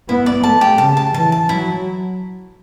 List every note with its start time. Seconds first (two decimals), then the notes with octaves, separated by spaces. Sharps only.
0.08 B3 E4
0.26 D5
0.43 A3 A5
0.61 G4
0.78 C#3 A5
0.97 A5
1.14 E3 A5
1.32 A5
1.49 F#3 E4